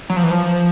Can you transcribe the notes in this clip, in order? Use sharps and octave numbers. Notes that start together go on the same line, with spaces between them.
F#3
F3
E3
F3